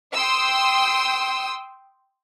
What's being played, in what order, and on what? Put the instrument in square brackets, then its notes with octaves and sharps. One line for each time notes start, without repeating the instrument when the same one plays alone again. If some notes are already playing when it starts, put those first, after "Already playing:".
[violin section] G5 C6 D#6 E6